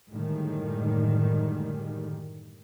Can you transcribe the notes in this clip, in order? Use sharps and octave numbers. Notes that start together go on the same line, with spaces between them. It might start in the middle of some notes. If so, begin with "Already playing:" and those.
F#2 A2 D3 D#3 G3 G#3